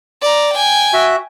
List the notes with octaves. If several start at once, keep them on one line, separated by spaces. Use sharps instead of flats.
D5 A#5
G5 G#5
F#4 E5